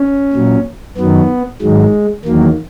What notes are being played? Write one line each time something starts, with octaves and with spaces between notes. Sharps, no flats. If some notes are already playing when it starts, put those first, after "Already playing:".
Already playing: C#4
A#2 F#3
F#2 D#3 F#3 B3
G#2 D#3 F#3 G#3
E2 D#3 F#3 A#3